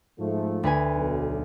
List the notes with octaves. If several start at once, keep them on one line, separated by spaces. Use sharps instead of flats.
G#2 F3 A3
D2 B4 G#5
B1